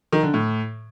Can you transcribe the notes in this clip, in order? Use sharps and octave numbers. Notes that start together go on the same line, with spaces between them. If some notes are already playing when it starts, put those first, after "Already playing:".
D#3
D3
A2